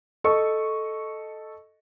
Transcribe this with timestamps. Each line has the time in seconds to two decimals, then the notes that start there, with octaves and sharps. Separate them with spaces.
0.24 A4 D#5 C#6